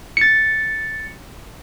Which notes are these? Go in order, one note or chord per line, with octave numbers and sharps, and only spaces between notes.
A6 C#7